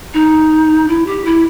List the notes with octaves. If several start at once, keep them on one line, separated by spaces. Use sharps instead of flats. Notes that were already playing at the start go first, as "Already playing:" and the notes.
D#4
E4
G4
E4